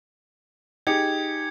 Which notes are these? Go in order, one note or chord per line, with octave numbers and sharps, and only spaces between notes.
D#4 G4 G#4 G#6 C#7